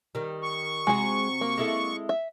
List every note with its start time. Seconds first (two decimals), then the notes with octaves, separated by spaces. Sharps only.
0.15 D#3 G3
0.43 C#6
0.87 C3 G#3 F#4 G#4
1.41 A#3
1.58 G#3 E4 A4
2.09 E5